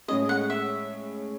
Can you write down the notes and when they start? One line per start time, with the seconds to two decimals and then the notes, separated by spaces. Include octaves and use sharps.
0.08 A2 G#3 C#4 G#4 D#5
0.29 F#5
0.50 E5